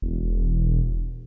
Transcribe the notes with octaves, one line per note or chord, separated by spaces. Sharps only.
E1